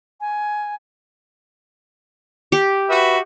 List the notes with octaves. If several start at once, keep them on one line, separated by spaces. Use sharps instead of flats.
G#5
G4
F#4 B4 E5